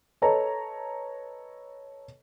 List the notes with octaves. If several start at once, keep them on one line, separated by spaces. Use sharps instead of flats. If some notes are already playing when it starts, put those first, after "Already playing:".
A4 B4 C#5 D#5 A5 A#5